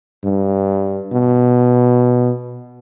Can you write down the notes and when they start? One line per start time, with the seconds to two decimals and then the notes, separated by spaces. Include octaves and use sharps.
0.24 G2
1.12 B2